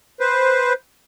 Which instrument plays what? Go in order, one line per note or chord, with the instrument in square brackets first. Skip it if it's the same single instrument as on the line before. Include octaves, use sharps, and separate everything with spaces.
[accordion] B4 C5